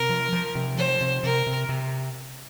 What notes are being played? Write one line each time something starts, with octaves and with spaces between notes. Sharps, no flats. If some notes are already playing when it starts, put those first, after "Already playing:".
Already playing: C3 A#4
F3
F3
C3
F3 C5
C3
C3 A#4
C3
C3